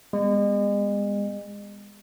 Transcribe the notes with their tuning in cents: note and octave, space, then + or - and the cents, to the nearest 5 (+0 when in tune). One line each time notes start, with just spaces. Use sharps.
G#3 -40 B3 +0